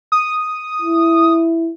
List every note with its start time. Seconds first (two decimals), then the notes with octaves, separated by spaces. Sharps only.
0.12 D#6
0.82 E4